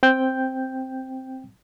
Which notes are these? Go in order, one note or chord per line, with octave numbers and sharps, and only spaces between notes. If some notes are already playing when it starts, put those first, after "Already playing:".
C4 G5 G6